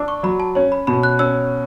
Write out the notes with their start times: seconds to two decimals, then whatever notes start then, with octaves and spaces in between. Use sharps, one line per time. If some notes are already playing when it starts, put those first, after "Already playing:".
Already playing: D4 D6 E6
0.08 C#6
0.23 F#3 B5
0.40 A5
0.55 C#4 C#5
0.72 B5
0.87 B2 B5
1.03 F#6
1.19 C#4 E6